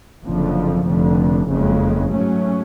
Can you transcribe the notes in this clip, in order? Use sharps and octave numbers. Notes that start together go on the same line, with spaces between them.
F#1 F2 D3 F3
F1 F2 D3
F#1 F2 C#3 G#3
G#2 F#3 A3 C#4